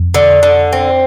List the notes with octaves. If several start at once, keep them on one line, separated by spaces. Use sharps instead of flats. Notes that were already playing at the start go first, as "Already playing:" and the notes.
Already playing: F2
D3
D3
C4